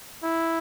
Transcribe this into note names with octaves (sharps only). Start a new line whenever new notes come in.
E4